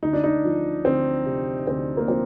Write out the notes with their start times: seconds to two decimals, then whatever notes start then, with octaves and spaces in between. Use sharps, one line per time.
0.02 D2 D#4
0.13 D4
0.24 D#4
0.45 F3
0.85 D2 C4
1.26 C3
1.67 D2 C4
1.97 A#3
2.08 F3 C4